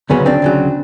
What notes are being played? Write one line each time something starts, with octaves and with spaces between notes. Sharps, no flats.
D2 C#3 F#3 B3 C#4
C4 D4
D2 C#3 F#3